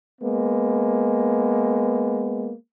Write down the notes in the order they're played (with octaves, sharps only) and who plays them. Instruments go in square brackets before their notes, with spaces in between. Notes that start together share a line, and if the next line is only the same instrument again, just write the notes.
[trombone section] G#3 A#3 B3